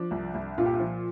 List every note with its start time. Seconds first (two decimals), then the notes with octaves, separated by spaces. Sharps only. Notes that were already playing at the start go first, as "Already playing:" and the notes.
Already playing: F3 D4
0.11 C2
0.34 C2
0.58 A#2 F4
0.65 G4
0.73 F4
0.80 F3